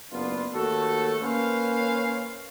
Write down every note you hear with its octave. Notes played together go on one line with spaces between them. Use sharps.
F#1 B3 D4 F4
D#2 A3 F#4 A4
A#3 C#4 B4 C5 F5